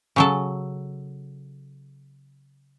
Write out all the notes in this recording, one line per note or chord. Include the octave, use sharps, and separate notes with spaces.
C#3 F#3 A4